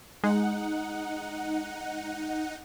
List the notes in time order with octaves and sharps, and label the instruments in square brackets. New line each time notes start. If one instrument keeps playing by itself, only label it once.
[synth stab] G#3 [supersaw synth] D#4 F#5